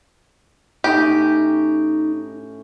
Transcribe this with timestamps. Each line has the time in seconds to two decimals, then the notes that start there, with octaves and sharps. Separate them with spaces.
0.84 A2 C#4 D#4 G4 D#5